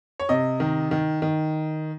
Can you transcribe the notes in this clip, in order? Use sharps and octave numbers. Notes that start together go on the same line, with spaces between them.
C#5
C3 D#5
D#3
D#3
D#3